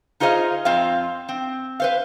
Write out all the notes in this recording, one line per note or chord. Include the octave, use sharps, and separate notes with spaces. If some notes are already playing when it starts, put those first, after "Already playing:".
D#4 F4 G#4 C5 D#5 F5
F2 C4 F4 F5
C4
B4 C5 F5